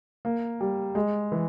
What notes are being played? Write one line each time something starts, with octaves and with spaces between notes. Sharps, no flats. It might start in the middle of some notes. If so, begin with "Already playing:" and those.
A#3
G3
G#3
E3